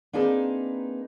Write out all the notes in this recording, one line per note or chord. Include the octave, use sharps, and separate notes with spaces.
A#3 C4 D4 D#4 G#4 B4